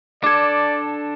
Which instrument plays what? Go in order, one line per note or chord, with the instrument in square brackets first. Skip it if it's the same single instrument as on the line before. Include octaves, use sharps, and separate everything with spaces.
[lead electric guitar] D4 A4 [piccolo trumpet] D5 [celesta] D6 G#6